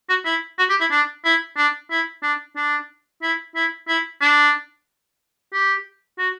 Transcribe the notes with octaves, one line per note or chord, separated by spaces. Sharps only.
F#4
E4
F#4
G4
E4
D4
E4
D4
E4
D4
D4
E4
E4
E4
D4
G4
F#4